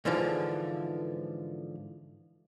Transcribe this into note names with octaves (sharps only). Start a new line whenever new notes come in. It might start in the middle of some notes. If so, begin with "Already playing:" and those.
G#2 D3 E3 F3